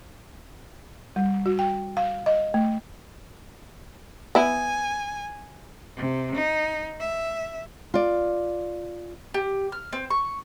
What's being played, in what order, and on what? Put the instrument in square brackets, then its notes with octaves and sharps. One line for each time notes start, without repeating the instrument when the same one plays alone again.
[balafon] G3
F#4
G5
F5
D#5
A3
[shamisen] B3 E4 [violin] G#5
[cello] C3
D#4
E5
[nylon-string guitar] F4 D5
[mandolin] G4
F6
C4
C#6